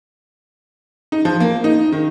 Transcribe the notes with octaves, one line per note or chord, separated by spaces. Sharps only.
D#4
F3
A#3
D#4
D#3